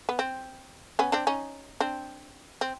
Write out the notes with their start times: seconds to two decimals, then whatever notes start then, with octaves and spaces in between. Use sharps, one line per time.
0.09 B3
0.19 C4
0.99 B3 C#4
1.12 C4 D4
1.27 C#4 D#4
1.81 C4 D4
2.61 C4